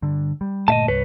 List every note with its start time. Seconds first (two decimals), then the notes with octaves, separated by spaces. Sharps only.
0.02 G2 D3
0.41 G3
0.68 G1 A#2 A3 D#5 E5 A5
0.88 C2 G2 B4 C#5